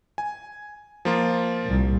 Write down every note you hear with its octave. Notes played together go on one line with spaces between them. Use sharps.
G#5
F3 A#3 F4
C2 A#2